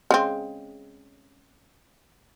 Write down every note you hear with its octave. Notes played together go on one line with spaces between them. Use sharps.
C#3 G#3 C4